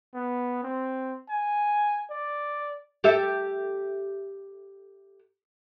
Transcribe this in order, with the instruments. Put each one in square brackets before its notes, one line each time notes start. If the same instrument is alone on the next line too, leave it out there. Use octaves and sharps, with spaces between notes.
[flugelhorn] B3
C4
G#5
D5
[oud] G4 A4 E5